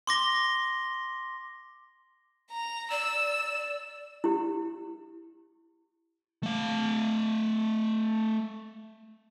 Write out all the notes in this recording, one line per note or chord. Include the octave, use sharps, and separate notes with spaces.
C6 D6 A#6 G7
A#5
D5 E6
E4 G4
A3 F5